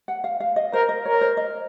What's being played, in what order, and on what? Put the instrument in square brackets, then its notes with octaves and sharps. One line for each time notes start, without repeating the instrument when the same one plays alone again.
[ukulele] F#5
F5
F5
D#5
[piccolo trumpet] A#4 [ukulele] C5
[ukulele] D#5
[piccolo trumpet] A#4 [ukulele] C#5
[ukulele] C5
D#5